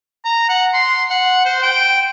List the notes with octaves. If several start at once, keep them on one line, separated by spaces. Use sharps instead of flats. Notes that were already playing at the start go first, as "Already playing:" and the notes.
A#5
F#5
C6
F#5
C5
G5